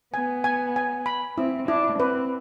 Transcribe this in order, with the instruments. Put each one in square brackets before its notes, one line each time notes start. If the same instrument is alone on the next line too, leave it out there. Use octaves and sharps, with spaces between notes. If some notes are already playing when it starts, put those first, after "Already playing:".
[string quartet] B3 [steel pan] G#5
[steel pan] G#5
G#5
B5
[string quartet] C4 [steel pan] E4
[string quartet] D4 [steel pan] E4
[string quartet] C4 [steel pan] B4